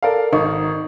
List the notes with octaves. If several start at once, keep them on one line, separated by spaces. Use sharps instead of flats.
A4 A#4 D5 F5
G#1 D#4 C#6